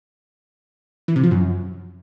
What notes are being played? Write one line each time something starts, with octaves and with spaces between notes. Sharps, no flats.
E3
C3
F3
F#2